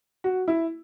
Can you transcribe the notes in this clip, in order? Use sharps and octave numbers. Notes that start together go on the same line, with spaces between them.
F#4
E4